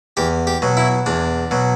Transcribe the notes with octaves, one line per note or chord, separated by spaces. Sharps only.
E2 G4
G4
B2 F#3
E4
E2 D4
B2 F#3